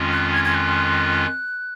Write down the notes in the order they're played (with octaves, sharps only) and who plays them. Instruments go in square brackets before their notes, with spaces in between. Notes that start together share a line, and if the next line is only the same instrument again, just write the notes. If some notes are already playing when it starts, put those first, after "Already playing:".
Already playing: [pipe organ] F2 D#3 G#3 C#4 F4
[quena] F#6
G#6
G#6
F#6